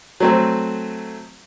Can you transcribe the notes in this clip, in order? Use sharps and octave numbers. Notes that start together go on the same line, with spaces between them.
F#3 A3 C4